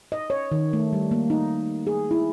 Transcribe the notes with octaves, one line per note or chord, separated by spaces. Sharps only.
D#5
C#5
D#3
A3
G3
A#3
D#4
G#4
E4